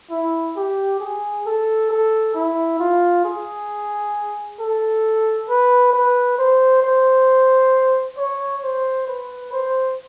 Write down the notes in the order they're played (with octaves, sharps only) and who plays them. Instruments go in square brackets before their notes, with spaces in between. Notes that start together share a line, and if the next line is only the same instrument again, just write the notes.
[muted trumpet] E4
G4
G#4
A4
A4
E4
F4
G#4
A4
B4
B4
C5
C5
C#5
C5
B4
C5